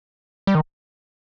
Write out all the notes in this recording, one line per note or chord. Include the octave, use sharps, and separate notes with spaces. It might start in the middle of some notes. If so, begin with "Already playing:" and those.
G3
D#3